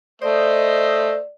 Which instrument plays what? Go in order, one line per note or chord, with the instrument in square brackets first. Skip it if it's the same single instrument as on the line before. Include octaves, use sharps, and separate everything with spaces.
[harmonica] A3 [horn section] C5 D#5 [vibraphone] D5